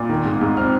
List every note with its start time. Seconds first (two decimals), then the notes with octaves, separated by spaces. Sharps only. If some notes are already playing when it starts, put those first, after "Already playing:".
Already playing: A#2
0.09 D#3
0.25 G#2
0.41 G#2
0.57 C4 F6